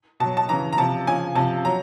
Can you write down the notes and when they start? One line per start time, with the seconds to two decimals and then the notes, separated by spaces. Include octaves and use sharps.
0.20 B2 F#3 A5
0.37 A5
0.49 C#3 E3 A#5
0.73 A#5
0.77 C3 F3 A5
1.07 C#3 F3 G#5
1.35 C3 F3 A5
1.65 F#3 A#5